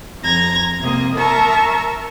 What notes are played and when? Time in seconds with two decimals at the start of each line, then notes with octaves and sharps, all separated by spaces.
0.22 F2 A#5 G#6 A#6
0.79 C3 A#3 D#5
1.14 A#4 E5 A5 A#5 C#6